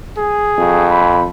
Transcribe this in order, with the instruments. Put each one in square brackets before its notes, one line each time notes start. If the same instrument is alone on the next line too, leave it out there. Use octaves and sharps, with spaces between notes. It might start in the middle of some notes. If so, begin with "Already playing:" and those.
[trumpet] G#4
[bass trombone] F2
[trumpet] B5